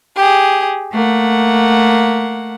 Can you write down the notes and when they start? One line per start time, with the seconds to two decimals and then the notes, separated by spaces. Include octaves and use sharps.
0.16 G4 G#4
0.94 A3 A#3 F#5